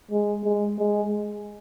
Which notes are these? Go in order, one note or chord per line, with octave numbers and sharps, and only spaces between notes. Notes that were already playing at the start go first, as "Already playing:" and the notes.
G#3
G#3
G#3